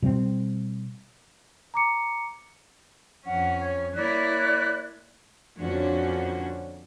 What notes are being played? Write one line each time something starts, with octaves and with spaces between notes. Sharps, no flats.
B2 G3 A#3 C4
A#5 D6 C#7
F2 C#4 F#5
C#5
A#3 E4 C#5 D5 F#6
F2 A#2 D3 C#4 D4 F#4